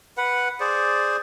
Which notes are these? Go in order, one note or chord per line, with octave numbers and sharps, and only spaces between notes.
B4 F#5
G#4 C5 D5